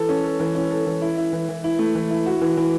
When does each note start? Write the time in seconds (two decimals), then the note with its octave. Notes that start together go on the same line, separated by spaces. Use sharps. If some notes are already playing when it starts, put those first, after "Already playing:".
Already playing: E3 A4
0.09 C#4
0.24 A4
0.40 E3
0.55 C#4
0.71 A4
0.86 E3
1.02 E4
1.17 E4
1.33 E3
1.49 E3
1.64 E4
1.79 A3
1.95 E3
2.11 E4
2.26 F#4
2.41 E3
2.57 E3